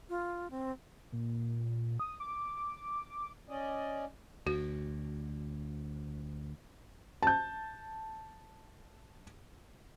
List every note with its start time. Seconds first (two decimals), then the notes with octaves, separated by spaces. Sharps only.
0.09 F4
0.51 C4
1.12 A#2
2.00 D#6
2.20 D6
3.49 C#4 D5 D#5
4.47 D2 F#4
7.23 A5 G6